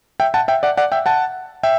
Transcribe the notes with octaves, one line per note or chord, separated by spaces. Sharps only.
E5 G5
F#5 A5
E5 G5
D5 F#5
D5 F#5
E5 G5
F#5 A5
E5 G5